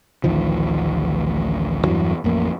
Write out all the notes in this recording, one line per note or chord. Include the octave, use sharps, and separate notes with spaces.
A1 D2 D#3 F3
E2 G2 E3 F#3
A1 F2 A#3